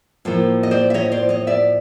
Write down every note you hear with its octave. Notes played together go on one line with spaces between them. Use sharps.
A2 F3 A#3
D#5
C5 D5
E5
C#5 D#5
C5 D5
C#5 D#5
D5 E5